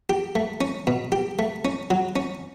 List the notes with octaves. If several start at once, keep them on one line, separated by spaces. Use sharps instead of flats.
G4
A3
C#4
B2
G4
A3
C#4
F#3
C#4